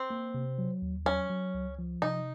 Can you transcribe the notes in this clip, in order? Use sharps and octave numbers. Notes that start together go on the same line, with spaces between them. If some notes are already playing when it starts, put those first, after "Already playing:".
Already playing: C4
A#3
C3
F#3
D#2
F#3 C#4
F#3
C#2
F3
C3 D#4